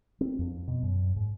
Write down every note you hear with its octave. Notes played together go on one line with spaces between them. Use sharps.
C4
F2
B2
F#2
G#2